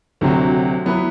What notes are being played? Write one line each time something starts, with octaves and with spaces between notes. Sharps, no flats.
D2 C3 F#3 C4 F#4
F#3 B3 E4 B4